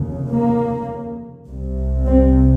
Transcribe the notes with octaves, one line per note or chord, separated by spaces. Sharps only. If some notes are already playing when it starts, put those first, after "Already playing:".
Already playing: F1 D#2 C#3
A#3
C2 C3
C4